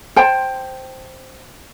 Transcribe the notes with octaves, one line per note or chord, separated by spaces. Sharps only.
C5 G5 A5